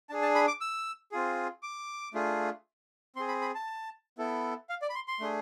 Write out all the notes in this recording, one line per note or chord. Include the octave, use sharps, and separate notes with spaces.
D4 G#4 A5
A5
B5
D6
E6
C4 F4 G#4
D6
A3 D4 F4 G#4
C4 G#4 C6
B5
B5
A5
B3 E4 A4
F5
D5
B5
C6
C6
A3 D4 G#4